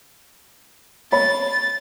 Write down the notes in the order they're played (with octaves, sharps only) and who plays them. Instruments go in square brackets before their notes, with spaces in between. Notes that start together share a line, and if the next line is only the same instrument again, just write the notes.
[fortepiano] C#5 B5 [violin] A6